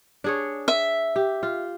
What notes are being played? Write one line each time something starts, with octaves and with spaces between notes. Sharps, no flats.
D4 G#4 C#5
E5
G4
F4